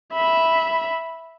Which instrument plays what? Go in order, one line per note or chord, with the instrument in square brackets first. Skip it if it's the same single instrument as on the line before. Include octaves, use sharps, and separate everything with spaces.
[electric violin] E5 B5